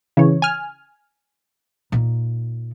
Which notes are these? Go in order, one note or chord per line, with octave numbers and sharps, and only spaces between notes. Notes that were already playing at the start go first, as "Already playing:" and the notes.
C#3 E3 C#5
G#5 F6
A#2 D#4